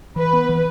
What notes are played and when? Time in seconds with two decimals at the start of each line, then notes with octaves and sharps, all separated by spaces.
0.16 E3 B4
0.33 B3
0.49 E3